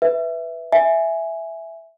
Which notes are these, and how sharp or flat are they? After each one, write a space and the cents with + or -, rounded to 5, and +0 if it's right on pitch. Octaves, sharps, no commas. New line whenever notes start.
B4 +0 E5 +0
E5 +0 G#5 +0